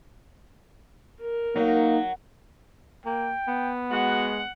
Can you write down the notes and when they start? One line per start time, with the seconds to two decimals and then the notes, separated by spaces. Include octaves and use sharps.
1.21 A#4
1.56 F#3 A#3 D#4
3.05 A#3 G5
3.48 B3
3.91 G#3 F#4 F#5